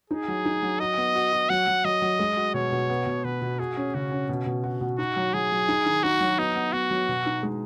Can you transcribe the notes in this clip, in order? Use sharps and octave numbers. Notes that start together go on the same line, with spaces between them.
D#4 G#4
F#3
D#4
F#3
F#4 D#5
B3
F#4
F#4
F#3 F#5
F#3
F#3 D#5
F#3
G#3
F#4
B2 C#5
B2
B3
B2
B2 B4
B2
F#4 G#4
C#4
C#3 F#4
C#4
B2
B2
F#4
B2
D#4 F#4
F#3
F#3 G#4
F#3
D#4
D#3
D#4 F#4
F#3
B3 D#4
B3
B3 F#4
F#3
B2
D#4
G#3